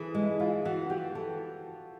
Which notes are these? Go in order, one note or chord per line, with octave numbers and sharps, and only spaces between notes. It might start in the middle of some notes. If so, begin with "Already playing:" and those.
Already playing: E3 G#4 A4 B4
G#3
E4
E3 F4
E3 F#4
F#4
E3 G4
E3 A4